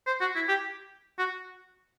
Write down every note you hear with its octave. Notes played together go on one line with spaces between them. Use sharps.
C5
F#4
E4
G4
F#4